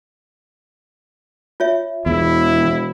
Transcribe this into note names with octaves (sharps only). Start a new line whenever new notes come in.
F4 C#5 E5
E1 E2 E4